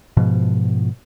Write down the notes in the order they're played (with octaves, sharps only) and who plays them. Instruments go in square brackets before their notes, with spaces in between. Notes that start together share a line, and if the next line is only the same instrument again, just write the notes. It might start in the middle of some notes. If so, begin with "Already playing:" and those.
[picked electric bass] G#2 B2 F3